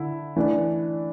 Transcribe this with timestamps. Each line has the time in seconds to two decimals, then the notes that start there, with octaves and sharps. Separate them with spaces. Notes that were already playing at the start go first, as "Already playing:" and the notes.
Already playing: D3 E4
0.36 E3 A3 D4